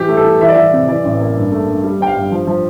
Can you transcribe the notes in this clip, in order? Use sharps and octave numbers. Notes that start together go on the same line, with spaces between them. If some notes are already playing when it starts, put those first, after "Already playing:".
Already playing: E3 G4
A3
A4
E3
E3 E5
D5
E3 E5
C3
E3 D5
A1
A#3
G2
A3
G2
G3
G1 G5
F5
G2
F3
F3